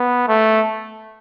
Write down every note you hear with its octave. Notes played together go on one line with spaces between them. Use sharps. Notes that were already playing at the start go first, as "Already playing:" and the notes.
Already playing: B3
A3